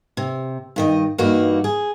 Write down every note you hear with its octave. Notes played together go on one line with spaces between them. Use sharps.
C3
G2 D#3 D#5
G2 E3 A#3 D#4 F#4
G#4